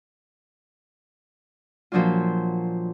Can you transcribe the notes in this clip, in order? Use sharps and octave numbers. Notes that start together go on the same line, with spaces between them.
A#2 F3 F#3 D4 F4